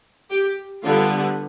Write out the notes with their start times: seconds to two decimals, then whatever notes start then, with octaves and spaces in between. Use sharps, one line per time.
0.30 G4
0.83 D3 G3 B3 F4